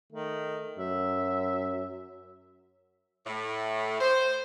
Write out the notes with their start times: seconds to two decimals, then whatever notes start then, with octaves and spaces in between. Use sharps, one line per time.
0.13 D#3 A3
0.78 F#2 E5
3.25 A2
4.00 C5